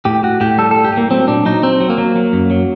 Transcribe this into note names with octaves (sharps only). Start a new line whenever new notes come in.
A2 G4
A2 F#4
A2 G4
G3 A4
G3 A4
G4
A2 A#3
F#3 C4
A#2 D4
F#3 D#4
F#3 C4
F#3
A#3
F#3
F#3
F#2
F#3